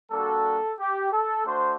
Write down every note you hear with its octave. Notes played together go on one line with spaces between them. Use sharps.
G3 A#3 D4 F#4 A4
G4
A4
A3 D4 F#4 C5